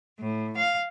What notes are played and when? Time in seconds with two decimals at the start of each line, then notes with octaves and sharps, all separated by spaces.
0.18 A2
0.56 F5